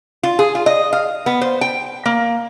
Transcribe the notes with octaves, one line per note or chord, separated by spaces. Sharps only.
F4
G#4
F4
D#5
F5
B3
C5
G5
A#3